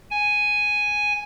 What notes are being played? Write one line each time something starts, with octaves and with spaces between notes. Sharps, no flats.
G#5